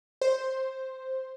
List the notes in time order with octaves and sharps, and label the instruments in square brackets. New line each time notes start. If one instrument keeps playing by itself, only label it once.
[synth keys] C5